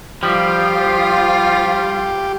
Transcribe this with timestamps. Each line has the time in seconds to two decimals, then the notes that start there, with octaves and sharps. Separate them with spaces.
0.23 F3 G3 F4 G4 F5